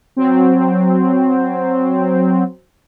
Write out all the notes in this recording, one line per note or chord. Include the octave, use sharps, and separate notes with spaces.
F#3 C4